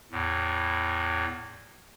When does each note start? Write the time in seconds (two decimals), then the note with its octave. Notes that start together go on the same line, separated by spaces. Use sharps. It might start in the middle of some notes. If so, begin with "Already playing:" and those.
0.11 E2 A2